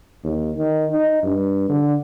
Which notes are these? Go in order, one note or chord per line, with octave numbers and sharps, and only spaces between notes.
D#2
D#3
D#4
G2
D3